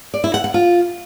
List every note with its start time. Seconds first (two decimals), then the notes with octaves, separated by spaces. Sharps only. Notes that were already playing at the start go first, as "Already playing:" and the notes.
0.14 D5
0.24 E4
0.34 F#5
0.44 F#5
0.54 F4